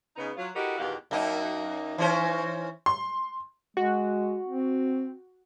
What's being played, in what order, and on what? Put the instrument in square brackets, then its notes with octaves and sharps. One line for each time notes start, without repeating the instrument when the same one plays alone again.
[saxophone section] C#3 B3 D#4
F#3 F4
E4 F#4 G4 A4 A#4 D#5
E2 B2 D#3 G4 F5 F#5
[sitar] F#2 A#3 D#4
E3 C#4 C5
[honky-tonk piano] C6
[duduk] G#3 [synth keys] F#4
[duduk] C4